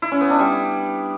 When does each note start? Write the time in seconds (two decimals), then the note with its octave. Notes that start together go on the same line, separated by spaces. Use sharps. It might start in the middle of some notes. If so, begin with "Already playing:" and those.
0.02 E4
0.12 C#4
0.21 B3
0.30 D4
0.40 G3